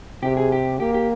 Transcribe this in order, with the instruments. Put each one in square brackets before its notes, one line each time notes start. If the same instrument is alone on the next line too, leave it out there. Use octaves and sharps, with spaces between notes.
[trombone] C3 [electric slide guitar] G4
[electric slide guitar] G#4
G4
[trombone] A#3 [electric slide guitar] G4
[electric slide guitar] G4